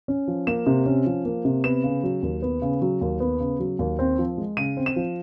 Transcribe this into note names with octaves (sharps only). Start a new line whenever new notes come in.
C#4
F3
A#3 E7
C3
C#4
F3
A#3
C3
B3 E7
C#3
F#3
D#2
B3
C#3
F#3
D#2
B3
C#3
F#3
D#2
C4
F3
G#3
C#3 D#7
C4
E7
F3